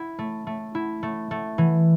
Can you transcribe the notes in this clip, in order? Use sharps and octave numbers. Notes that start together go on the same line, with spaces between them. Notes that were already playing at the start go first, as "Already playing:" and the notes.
Already playing: E4
A3
A3
E4
A3
A3
E3